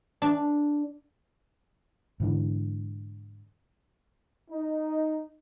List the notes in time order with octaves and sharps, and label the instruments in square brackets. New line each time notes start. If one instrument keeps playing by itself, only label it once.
[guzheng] D4
[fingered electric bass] G#2 D3 E3
[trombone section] D#4